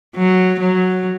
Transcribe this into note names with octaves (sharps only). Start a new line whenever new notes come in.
F#3
F#3